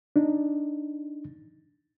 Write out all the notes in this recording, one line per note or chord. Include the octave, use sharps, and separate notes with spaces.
D4 D#4